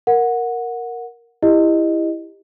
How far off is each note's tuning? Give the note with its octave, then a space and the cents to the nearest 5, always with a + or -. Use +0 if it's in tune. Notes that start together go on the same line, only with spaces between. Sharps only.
A#4 +0 F#5 -15
E4 +0 G4 +20 D#5 -10